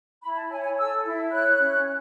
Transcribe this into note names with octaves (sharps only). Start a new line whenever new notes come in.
E4 B5
A5
C#5 G#5
G#5
A4 E6
E4
C#5 F#6
C#4